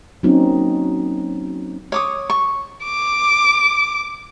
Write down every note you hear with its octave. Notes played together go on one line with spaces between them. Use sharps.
F#3 A#3 C4 C#4 D#4
C#5 D6 D#6
C#6
D6